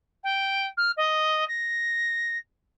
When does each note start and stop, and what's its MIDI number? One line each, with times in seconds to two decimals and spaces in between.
0.23 0.67 79
0.77 0.91 89
0.97 1.46 75
1.48 2.37 94